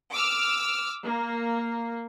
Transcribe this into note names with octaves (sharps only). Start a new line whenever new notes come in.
D6 E6 F6
A#3